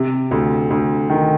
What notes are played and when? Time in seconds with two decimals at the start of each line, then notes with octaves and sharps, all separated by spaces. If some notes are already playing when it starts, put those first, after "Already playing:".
Already playing: C3
0.31 D2
0.70 D2
1.10 D#3